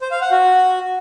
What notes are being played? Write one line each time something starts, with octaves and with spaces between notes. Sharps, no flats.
C5
F5
F#5
F#4